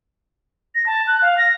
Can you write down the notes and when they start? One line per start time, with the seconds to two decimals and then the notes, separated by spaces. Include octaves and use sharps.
0.75 A#6
0.86 A5
1.07 F#6
1.22 F5
1.38 A#6